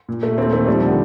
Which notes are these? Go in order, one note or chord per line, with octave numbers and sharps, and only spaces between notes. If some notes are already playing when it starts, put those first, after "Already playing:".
A#2
A#2 A3
D#2 A3 C4
D#3 A3
F3 G3
D3